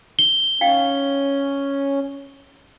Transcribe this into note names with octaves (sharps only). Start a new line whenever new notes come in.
G7
C#4 D#4 F5 G5